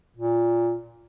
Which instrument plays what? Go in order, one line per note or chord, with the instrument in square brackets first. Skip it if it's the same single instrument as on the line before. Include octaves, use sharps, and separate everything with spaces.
[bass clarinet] A#2